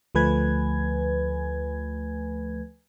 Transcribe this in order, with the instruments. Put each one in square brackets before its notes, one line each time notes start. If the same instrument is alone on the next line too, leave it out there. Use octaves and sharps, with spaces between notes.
[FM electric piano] D2 F3 A3 B4 G#5 G#6